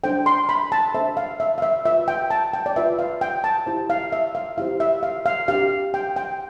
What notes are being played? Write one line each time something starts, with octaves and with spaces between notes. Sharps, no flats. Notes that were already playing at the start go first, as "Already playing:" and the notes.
D4 A4 C5 G5
C6
B5
A5
D4 A4 C5 E5
F5
E5
F5
E5
F4 B4 E5
G5
A5
G5
D5
F4 B4 E5
F5
G5
A5
E4 G4 C5
F5
E5
F5
E4 G4 C5 F5
E5
F5
F5
D4 G4 C5 F5
G5
G5